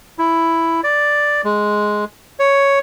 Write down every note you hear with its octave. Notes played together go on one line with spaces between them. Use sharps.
E4
D5
G#3
C#5